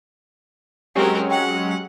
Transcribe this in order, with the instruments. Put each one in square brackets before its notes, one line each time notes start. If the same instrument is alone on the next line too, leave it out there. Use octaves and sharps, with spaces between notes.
[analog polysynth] F#3 G#3 C#4 [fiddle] C4 A#4 [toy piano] G4 G#4
[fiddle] F#5 [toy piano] G5